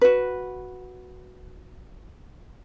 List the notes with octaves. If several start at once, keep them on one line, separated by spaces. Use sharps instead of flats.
F#4 B4